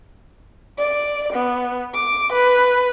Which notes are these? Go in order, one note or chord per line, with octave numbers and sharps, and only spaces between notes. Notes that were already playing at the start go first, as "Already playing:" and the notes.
D5
B3
D6
B4